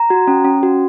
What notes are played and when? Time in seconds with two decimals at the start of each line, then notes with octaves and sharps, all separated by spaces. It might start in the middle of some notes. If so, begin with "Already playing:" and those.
Already playing: A#5
0.10 F#4
0.27 C#4
0.45 C#4
0.63 F#4